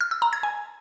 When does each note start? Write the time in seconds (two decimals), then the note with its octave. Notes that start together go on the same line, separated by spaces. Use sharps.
0.01 F6
0.11 E6
0.22 A#5
0.33 G#6
0.43 G#5